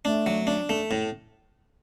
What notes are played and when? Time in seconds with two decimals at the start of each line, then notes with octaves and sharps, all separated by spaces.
0.05 A3 D4
0.26 F#3
0.47 D4
0.69 A3
0.91 A2